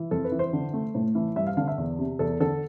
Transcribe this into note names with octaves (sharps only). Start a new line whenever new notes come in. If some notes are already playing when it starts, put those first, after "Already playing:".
Already playing: E3
F2 A4
B4
E3
C5
D3
A3
A2
E3
G2 E5
F5
D3 F5
E5
E2
C3
E2 A4
D3 A4